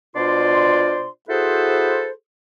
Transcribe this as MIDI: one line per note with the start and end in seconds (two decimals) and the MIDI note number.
0.16 1.07 47
0.16 1.07 62
0.16 1.07 65
0.16 1.07 72
0.16 1.07 74
0.16 1.07 84
1.29 2.11 64
1.29 2.11 66
1.29 2.11 68
1.29 2.11 69
1.29 2.11 71
1.29 2.11 72